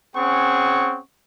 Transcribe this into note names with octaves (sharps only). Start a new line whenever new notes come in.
C4 C#4 G#4 F#5 C#6